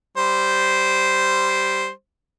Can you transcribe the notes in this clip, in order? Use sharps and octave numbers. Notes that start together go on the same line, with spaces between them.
G3 C5